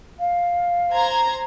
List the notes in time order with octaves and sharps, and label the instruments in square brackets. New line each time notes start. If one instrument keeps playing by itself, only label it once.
[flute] F5
[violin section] C5 A#5 G#6